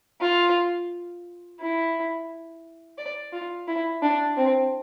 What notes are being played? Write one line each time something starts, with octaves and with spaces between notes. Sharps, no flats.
F4
E4
D5
F4
E4
D4
C4